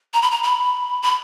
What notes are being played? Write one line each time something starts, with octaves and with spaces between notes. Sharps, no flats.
A#5
B5
A#5
B5
B5